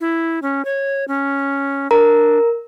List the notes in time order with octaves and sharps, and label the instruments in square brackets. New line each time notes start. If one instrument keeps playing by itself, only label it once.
[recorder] E4
C#4
C#5
C#4
[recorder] D4 [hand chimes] A#4 A#5